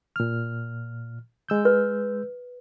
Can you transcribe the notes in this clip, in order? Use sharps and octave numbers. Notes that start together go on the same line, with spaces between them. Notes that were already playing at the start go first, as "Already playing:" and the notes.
A#2 F6
G#3 E6 G6
B4